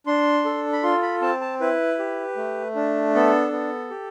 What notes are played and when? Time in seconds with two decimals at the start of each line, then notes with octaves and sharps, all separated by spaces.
0.07 D4 C6
0.45 A4
0.73 B5
0.83 F4 C6
1.02 B5
1.22 C4 A5
1.41 A5
1.61 E4 B4
1.99 G4
2.36 A3
2.75 D4
3.14 B3 A4
3.52 B3
3.90 G4